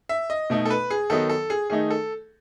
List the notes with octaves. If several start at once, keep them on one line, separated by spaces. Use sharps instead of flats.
E5
D#5
B2 A3 D#4
A4
B4
G#4
D#3 F#3 B3 D#4 A4
A4
G#4
D#3 A3 D#4 G#4
A4